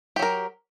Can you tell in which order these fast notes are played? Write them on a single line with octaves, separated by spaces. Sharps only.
G4 F#3 A#4